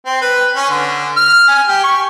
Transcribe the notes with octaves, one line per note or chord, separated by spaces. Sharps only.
C4
B4
C#4
D3
F6
G#5
G4
C#6